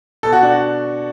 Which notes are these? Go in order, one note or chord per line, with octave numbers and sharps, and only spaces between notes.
B2 A4
F#4
D4
F#4